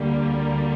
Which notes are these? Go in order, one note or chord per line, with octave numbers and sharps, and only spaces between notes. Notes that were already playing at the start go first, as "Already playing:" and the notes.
Already playing: D2 D3 G3 A#3